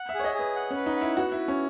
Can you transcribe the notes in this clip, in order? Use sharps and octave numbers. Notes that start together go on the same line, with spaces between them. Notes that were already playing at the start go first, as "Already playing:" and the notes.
Already playing: F#5
E5
G#4 C#5
D#5
G#4 B4
F#5
C#4
B4
D#4
F#5
E4
B3 F#4
E4
B4
C#4